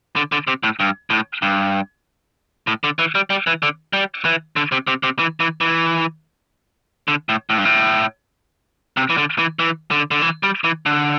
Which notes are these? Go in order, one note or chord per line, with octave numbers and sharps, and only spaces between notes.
D3
D3
C3
A2
G2
A2
G2
A2
D3
E3
G3
G3
E3
D3
G3
E3
D3
C3
C3
C3
E3
E3
E3
D3
A2
A2
G2
A2
C3
E3
D3
E3
E3
D3
D3
E3
G3
E3
D3